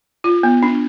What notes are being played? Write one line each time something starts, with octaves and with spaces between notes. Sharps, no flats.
F4
B3
D4